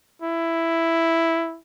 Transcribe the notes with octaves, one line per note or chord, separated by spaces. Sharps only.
E4